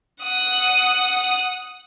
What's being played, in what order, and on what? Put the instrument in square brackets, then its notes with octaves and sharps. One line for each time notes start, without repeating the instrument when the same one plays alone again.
[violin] F#5 D#6